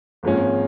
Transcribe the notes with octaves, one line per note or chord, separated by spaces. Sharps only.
G#1 G#2 F3 A#3 C#4